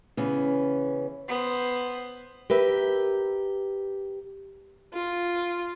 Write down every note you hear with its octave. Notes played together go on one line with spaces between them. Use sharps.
C#3 E3 B3 C#4
B3 C5
G4 A#4 B4 E5
F4